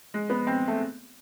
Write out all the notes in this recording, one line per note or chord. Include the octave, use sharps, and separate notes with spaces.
G#3
B3
C4
A3